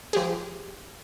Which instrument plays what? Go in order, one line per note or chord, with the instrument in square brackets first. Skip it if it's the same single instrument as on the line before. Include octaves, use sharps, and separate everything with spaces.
[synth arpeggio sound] F3 G4 G#4